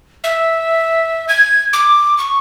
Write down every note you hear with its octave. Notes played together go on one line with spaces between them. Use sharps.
E5
G#6
D6
C#6